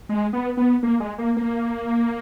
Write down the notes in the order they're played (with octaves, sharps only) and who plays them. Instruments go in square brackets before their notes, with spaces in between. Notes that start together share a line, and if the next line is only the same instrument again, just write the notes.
[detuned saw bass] G#3
B3
B3
A#3
G#3
A#3
A#3